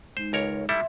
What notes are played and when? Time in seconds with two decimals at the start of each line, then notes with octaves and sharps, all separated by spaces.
0.17 G#3 D#4 C5
0.33 C#2 A#4 C#5
0.69 G3 E4 A4 E5 C6